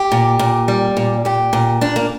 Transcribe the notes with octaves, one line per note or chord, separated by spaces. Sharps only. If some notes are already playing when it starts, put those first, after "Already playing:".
Already playing: G4
A#2
A#2
G3
A#2
A#2 G4
A#2
A#2 D4
A#3